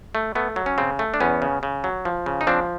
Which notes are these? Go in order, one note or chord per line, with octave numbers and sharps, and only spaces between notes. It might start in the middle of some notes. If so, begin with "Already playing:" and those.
A3
A3 B3
F#3
C#4
C#3 C4
A3
D4
E2 B3 C#4
C#3
C#3
F#3
F3
C#3
D#4
F3 C4 D4